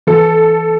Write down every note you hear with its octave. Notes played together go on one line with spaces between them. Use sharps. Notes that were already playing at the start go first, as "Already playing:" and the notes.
E3 A4